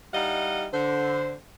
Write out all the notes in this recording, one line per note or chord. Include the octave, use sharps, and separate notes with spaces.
G3 D#4 E4 D#5 F5 F#5
D3 C5